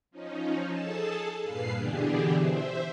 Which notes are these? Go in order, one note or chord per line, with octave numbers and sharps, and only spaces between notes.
F3 C#4 D#4
G#4 A4 A5
G2 A#2 B4 F5 C7
B2 D3 E3 D4 G4 G#4
C5 E5